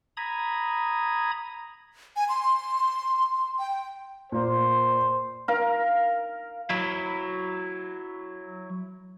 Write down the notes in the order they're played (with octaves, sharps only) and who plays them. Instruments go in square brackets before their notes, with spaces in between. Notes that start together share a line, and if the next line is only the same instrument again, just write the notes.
[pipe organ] A#5 B5 D#6 G#6
[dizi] G#5
C6
G5
[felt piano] A#2 A#3 [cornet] C5
[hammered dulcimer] A#4 F5
[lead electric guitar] F#3 E4